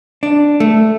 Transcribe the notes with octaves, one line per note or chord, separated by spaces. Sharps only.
D4
A3